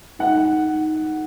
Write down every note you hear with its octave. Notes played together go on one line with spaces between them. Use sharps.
D#4 F#5
D#4